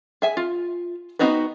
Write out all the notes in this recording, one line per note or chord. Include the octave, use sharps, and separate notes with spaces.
G#4 E5 G#5
F4
B3 C4 D#4 F#4 B4